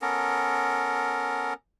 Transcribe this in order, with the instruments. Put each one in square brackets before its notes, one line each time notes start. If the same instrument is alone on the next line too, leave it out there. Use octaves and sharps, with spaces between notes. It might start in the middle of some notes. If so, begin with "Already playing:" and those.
[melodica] B3 C#4 A4 A#4